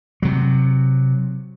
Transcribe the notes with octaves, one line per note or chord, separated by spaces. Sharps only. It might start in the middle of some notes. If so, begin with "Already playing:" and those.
C3 F#3